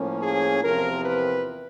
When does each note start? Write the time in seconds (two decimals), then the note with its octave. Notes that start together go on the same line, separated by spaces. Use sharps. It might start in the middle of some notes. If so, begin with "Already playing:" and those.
Already playing: A2 F3 A#3 C#4
0.21 G#4
0.63 E2 C3 F3 A#4
1.04 B4